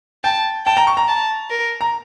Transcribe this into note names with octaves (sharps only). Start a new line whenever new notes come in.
G5 A5
G5 A5
A#5
C#6
A#5
A5
A#4
A#5